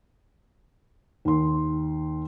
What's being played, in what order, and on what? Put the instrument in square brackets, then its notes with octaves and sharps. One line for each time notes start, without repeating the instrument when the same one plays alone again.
[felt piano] D#2 C6